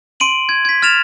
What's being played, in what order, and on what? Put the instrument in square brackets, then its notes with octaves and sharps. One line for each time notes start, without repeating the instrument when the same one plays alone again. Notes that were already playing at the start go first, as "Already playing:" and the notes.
[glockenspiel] C6 D7 D#7 F#7
G#6
G#6 B6
F6 A6 E7 F7